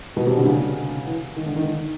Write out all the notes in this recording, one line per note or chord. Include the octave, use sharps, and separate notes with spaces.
B2
C3
D3
C#3
D3
E3
D#3
D3
D#3